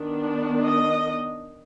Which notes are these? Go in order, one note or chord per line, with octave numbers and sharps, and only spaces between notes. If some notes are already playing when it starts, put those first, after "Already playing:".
Already playing: D#3 B3 D4
D#5